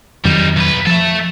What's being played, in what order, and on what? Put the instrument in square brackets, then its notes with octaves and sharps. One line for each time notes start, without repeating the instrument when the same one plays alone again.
[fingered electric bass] F2 D#3 F#3 [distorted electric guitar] G3 D#4
[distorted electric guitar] B1 B4
[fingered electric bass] F3 [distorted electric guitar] A4 E5